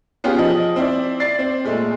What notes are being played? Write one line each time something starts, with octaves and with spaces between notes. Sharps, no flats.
B3 C#4 F4 G4 G#4
F3 D#5
C4 E4 D5
D5 A6 C7
C4
A#2 G#3 A3